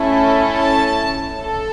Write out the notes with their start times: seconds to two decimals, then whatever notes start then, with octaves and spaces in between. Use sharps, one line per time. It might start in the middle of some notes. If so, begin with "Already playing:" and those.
Already playing: A3 C#4 E4 A4
0.55 A5
1.41 A4